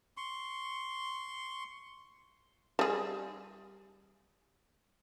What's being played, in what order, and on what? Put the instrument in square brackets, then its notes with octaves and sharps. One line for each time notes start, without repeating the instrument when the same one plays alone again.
[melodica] C6 C#6
[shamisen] G3 G#4